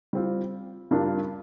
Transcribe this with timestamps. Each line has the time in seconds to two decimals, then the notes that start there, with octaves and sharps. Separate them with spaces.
0.13 G3 C4 F4
0.91 G2 G3 D4 F4 A#4